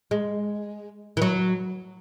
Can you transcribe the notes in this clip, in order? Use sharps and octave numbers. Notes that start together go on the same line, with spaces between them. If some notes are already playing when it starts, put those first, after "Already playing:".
G#3
E3
F#3